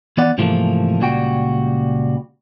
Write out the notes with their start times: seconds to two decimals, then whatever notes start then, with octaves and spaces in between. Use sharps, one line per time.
0.17 E3 B3 D5 F#5
0.38 G#2 C3 E3 F3 A3 A#3
1.00 C#2 A#2 G3 F#4 G5